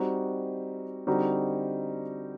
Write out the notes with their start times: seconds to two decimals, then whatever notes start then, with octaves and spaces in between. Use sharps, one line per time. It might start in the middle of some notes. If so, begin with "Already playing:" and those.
Already playing: G3 C4 D#4 F#4
1.07 D3 G3 C4 D#4 F#4